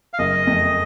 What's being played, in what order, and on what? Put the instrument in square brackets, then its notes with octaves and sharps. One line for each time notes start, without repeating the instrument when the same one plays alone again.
[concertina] F5
[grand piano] F#1 [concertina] D#5
[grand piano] F2